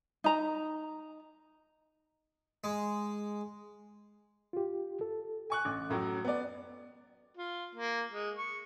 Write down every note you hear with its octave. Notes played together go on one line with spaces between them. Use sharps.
D#4 A#5
G#3
F4 G4
A4
G#5 C#6 F#6
A1 D6
F#2 A2 F#3
B3 D5
F4
A#3
G#3
C#6